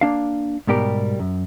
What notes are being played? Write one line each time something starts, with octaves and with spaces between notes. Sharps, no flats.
A#3 D4 F5
G#2 B2 G3 G4 A#4
F#2